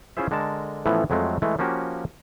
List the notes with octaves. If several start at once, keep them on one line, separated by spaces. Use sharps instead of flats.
C#4 E4 F4 G#4 C5 E5
D3 G#3 A4 A#4 A5
A2 E3 F3 A3 B3 C#4
F2 F#3 G#3 A3 C4
E3 G#3 A3
F3 A#3 C#4 F#4 G4